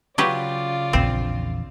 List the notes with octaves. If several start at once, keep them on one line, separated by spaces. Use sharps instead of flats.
C#3 F#3 F4 G4 B4 D5
A#1 E2 C4